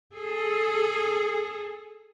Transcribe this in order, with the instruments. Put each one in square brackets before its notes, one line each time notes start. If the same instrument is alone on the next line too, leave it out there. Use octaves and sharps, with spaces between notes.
[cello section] G#4 A4